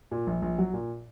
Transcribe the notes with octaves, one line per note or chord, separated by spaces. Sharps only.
A#2
A#1
A#1
F#3
A#2